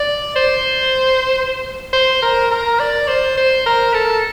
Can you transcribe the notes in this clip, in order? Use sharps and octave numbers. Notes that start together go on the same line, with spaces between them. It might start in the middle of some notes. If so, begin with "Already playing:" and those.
Already playing: D5
C5
C5
A#4
A#4
D5
C5
C5
A#4
A4